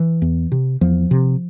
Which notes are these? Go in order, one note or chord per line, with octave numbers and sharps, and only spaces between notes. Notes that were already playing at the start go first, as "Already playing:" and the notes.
Already playing: E3
E2
C3
E2 F3
C3